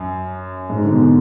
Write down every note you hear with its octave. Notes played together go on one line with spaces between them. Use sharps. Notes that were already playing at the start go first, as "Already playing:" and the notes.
Already playing: F#2
G#2
D3
B2